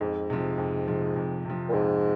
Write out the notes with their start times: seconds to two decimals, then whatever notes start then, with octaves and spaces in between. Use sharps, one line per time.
0.01 F2 G#2
0.30 C3 F3
0.58 F2
0.87 C3 F3
1.16 F2
1.45 C3 F3
1.69 A#2
1.73 F2 G#2